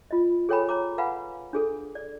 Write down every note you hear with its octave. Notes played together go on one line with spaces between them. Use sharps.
F4 D#5
G#4 A4 C#5 G5 G#5 B5
C#5 A#5 D6
B4 F5 F#5 G#5 B5
D4 G#4 A4
D5